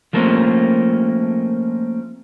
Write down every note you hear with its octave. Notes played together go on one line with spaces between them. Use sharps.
F3 A3 A#3 C4 C#4